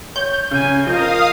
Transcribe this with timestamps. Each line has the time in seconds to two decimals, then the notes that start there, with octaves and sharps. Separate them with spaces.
0.16 C#5 G6
0.51 C#3 C#4 G#5 D#7
0.87 F3 A#4 D#5 F5 D#6